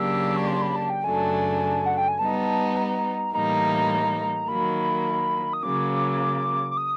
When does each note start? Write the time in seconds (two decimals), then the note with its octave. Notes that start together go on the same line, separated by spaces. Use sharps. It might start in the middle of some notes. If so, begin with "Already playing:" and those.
Already playing: C#3 F#3 A#3 D4 G4 E6
0.37 C#6
0.47 C6
0.62 B5
0.76 A5
0.90 G5
1.04 F#2 C#3 F#3 A3 D4 G#5
1.86 F#5
1.98 G5
2.08 G#5
2.19 G3 B3 D#4 A5
2.77 A#5
3.34 A2 E3 G3 A#3 D#4 A#5
4.48 D#3 F#3 A#3 B5
5.53 D#6
5.63 C#3 F#3 A#3 D6
6.71 D6
6.77 D#6